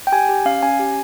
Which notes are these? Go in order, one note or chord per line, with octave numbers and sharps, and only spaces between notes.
G5
G4 G#5
G4
C#4 F5
C#4 G#5
G4